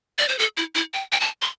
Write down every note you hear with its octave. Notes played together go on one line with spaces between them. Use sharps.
D5
C5
A4
E4
E4
G5
G5
A5
C6